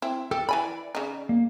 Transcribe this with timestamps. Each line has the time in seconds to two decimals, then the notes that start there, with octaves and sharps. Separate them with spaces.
0.02 C4 E4
0.31 G4 A4
0.49 E3 D5 G#5 B5
0.95 C#3 D#4
1.29 A#3